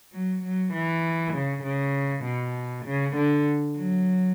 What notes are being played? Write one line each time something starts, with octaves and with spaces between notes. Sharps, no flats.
F#3
F#3
E3
C#3
C#3
B2
C#3
D3
F#3